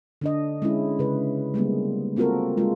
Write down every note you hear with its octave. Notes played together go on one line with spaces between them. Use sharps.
D3 D4 D#5
G#3 C#4 E4
C#3 B4
G3 G#3 A#3 B3
A#3 C4 F4 F#4 A4 A#4
G#3 F4